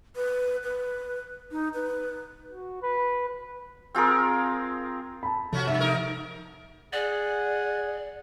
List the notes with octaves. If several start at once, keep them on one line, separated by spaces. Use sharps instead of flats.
B4
B4
D#4
B4
F#4
B4
B4
C4 F4 G#4 A#4
A5 B5
C3 F3 A3 C#4 F#4
G2 E5
A3 D#4 A#4
G#4 D5 F#5